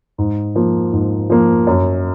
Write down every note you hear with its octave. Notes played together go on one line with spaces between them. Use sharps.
G#2
F3 A#3
G#2
F3 A#3
F#2